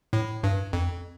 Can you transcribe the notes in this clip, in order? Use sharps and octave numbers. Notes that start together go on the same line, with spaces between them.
A2
G2
F2